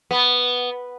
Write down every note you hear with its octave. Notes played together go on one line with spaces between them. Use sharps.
B3